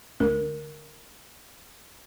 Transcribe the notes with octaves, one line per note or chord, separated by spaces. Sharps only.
D2 A#4